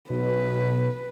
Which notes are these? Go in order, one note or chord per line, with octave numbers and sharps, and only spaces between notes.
B1 B2 B4